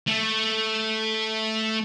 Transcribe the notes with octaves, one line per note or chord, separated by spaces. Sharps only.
A3 A4